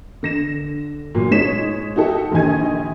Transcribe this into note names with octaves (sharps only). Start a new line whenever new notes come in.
D3 A#6 E7
A#2 F#3
G#2 G#3 D#4 C#5 B6 E7
D#4 E4 F#4 G4 A4
A#1 D#2 D#4 G#5 G#6